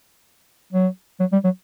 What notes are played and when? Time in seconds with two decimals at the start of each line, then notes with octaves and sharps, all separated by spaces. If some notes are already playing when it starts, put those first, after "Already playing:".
0.73 F#3
1.20 F#3
1.32 G3
1.44 F#3